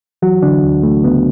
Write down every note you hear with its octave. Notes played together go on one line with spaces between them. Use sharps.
E3 F#3 F#4
D3 D4
D2
A3
C#3 B3